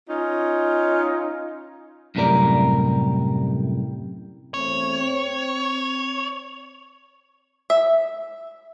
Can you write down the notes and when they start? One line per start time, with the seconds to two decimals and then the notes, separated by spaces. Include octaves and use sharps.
0.09 C#4 D#4 F4
2.15 F#2 A2 C3 G3 A#4 D5
4.54 E2 A3 C4 C#5
4.99 C4
7.70 E5